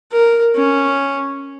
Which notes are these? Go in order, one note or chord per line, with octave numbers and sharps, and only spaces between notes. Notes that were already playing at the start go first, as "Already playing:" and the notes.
A#4
C#4